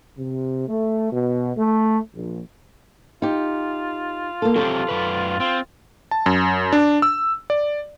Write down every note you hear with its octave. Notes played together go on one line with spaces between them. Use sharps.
C3
A3
B2
A3
A#1
D#4 F4 G4
A#3 A4
F#3 C4 G4 A4
F#2 B2 B4
C4 F4
A5
F#2
D4
E6
D5